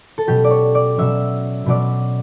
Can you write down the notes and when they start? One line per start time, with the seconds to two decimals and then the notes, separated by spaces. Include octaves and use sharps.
0.18 A4
0.27 B2 F#3 C#4 G4
0.44 D5
0.51 C#5
0.75 D5
0.98 B2 F#3 C#4 E5
1.66 B2 F#3 C#4 D5